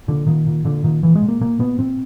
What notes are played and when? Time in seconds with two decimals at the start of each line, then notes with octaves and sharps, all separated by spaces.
0.08 A#2 D3
0.27 A#2 D#3
0.46 A#2
0.65 A#2 D3
0.84 A#2 D#3
1.03 A#2 E3
1.15 G#3
1.22 A#2
1.28 A#3
1.41 A#2 A#3
1.59 A#2 B3
1.79 A#2 C4